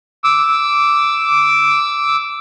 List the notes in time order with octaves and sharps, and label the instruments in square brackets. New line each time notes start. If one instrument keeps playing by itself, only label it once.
[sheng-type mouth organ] D6 E6